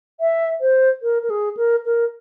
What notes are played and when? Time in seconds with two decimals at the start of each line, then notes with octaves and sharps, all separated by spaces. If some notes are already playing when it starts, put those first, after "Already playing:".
0.20 E5
0.61 C5
1.03 A#4
1.23 A#4
1.30 G#4
1.57 A#4
1.86 A#4